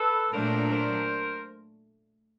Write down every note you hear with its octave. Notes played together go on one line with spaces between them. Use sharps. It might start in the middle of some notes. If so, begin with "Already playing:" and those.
Already playing: A4 B4
A#2 F#3 A3 D4 A#4 C5
A#4 C5